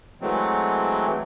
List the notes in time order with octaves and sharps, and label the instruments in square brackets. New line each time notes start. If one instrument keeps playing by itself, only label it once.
[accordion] E3 F#3 G#3 A3 C4